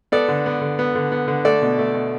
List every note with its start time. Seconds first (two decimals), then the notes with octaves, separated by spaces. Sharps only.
0.12 B3 A4 D5
0.29 D3
0.46 B3
0.61 D3
0.79 B3
0.95 D3
1.12 B3
1.28 D3
1.45 A3 A4 D5
1.62 B2
1.78 A3
1.94 B2